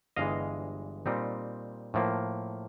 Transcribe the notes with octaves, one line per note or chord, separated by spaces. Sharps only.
G1 G2 E3 G#3 D#5 F5
A#2 G3 C4 D#4
A2 F3 A#3